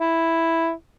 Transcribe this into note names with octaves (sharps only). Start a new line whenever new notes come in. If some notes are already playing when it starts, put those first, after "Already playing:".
E4